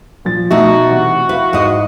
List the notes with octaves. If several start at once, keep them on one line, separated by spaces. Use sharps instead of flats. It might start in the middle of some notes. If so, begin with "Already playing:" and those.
A#2 F3 A6
B2 A3 D#4 F#4 E5 A#5 E6
C3 E3
E4 B4 F5
G#2 D#5